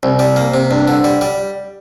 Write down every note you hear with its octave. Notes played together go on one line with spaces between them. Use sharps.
C2
G3
A#3
C3
G2
D3
G3
G3